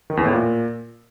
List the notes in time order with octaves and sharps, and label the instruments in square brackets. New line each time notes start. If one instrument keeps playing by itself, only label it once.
[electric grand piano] D#3
E2
A2
A#2